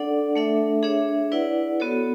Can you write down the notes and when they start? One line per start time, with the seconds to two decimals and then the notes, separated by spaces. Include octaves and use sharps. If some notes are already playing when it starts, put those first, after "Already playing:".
Already playing: D4 A4 D5 F#5
0.35 A3 D4 A4 E5
0.83 D4 G#4 C#5 E5
1.32 E4 B4 D5 F#5
1.80 B3 F#4 A4 C#5